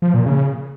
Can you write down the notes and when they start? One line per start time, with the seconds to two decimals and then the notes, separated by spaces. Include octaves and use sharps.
0.02 F3
0.14 A#2
0.26 C#3